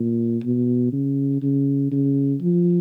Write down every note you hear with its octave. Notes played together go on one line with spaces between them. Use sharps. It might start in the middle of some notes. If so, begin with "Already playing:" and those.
Already playing: A#2
B2
C#3
C#3
C#3
F3